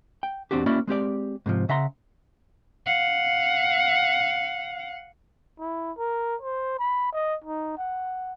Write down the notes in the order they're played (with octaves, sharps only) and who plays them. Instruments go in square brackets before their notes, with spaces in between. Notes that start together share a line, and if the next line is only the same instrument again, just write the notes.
[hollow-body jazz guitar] G5
E2 C#3 C4 D4 F#4 G4
A#3 C#4 E4 F#4 D5
G#3 C4 G4 D5
G#2 C3 F3
C#3 E5 F#5 A#5 C6
[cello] F5 F#5
[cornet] E4
A#4
C5
B5
D#5
D#4
F#5